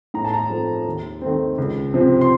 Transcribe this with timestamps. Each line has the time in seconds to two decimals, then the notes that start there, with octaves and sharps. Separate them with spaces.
0.14 A2 A#5
0.25 A5
0.34 A#5
0.50 F3 A3 C4
0.87 D#2
1.22 D#3 A3 C4
1.58 C#2
1.94 C3 F3 C4
2.21 C6